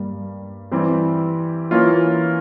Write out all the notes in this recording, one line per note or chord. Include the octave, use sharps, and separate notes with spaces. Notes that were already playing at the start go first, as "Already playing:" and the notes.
Already playing: G2 G3 A#3
E3 G3 C4 G4
E3 A#3 C#4 F4